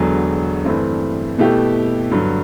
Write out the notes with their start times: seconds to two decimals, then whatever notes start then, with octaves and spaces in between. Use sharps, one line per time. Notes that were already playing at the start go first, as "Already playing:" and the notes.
Already playing: E1 E2 D3 F#3
0.65 G2 E3 A3 C4 E4
1.38 B2 A3 E4 G4
2.11 G2 D3 F#3